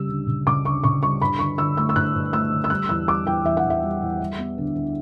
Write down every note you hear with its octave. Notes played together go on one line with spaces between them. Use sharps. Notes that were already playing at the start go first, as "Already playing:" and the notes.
Already playing: C#3 G3 E6
D2
C#3
C#3 D6
D2 C#6
C#3 C#6
G3 C#6
G2 B5
D3 C#6
D3 E6
A3 E6
E6
G2 F#6
G2
A3 E6
D3
E6
G3 F#6
E2 E6
G3 D6
E2 G5
E2 E5
F#5
E2
E5
G3
E2
G3
B3
D2
D2